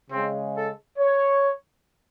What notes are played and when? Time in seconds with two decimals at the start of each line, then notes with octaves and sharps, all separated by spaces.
0.10 C#3 G#3 C4
0.54 A4
0.98 C#5